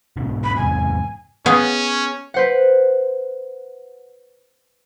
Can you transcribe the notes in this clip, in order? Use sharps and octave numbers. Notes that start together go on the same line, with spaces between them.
G#2 B2 D3
B5
E2 G#2 C3 G#5
B3 C#4 G#4 F5
B4 C5 F#5